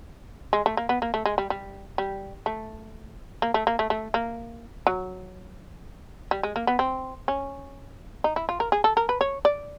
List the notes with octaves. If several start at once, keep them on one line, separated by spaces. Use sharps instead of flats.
G#3
A3
A#3
B3
A#3
A3
G#3
G3
G3
G3
A3
A#3
A3
A#3
A3
A3
A#3
F#3
G3
G#3
A#3
B3
C4
C#4
D#4
E4
F4
A#4
G#4
A4
A#4
B4
C#5
D5